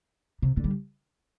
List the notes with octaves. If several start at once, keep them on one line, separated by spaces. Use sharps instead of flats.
C3
D3
G3